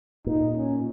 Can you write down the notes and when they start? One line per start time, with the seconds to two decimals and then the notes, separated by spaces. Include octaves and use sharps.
0.27 A#2 D#4
0.56 C#4